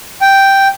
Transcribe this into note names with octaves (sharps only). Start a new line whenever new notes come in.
G5